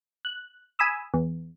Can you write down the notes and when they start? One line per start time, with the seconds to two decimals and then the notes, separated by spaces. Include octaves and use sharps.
0.25 F#6
0.79 G#5 B5 D#6 E6
1.14 E2